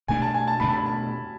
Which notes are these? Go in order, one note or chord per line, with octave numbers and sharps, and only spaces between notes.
B2 A3 D4 G#5
A5
G#5
A5
B2 A3 D4 B5
A5
B5
A5